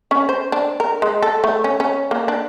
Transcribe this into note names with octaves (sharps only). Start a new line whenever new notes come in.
C#4
C5
D4
A#4
G#3
A4
A3
C#4
C#4
A#3
D4